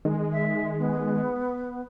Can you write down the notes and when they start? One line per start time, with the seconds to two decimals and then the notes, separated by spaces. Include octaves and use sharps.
0.05 D#3 G#3
0.32 E5
0.79 B3